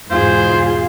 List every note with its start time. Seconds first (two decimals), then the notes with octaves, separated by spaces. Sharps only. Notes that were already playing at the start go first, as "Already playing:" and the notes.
0.10 E2 G#2 B2 F4 G#4 C5 F5